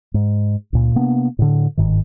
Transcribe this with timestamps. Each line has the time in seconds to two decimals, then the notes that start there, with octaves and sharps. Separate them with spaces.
0.14 G#2
0.73 C#2 A#2
0.95 C3 A#3 B3 D4
1.39 A2 D3
1.77 G1 G#2 D#3